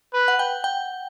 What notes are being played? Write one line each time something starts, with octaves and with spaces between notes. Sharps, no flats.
B4
F#5
G5
G5